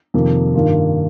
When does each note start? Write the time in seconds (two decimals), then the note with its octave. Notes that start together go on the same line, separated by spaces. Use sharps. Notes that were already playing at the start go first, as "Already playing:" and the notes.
0.14 F2 C3 D#3 A#3
0.55 G2 D#3 A#3 F4